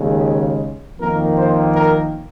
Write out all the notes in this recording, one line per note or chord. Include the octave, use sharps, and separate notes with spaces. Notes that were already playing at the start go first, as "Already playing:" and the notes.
Already playing: D#2 C#3 G#3
F2 D#3 A#3 A#4
C5
A#4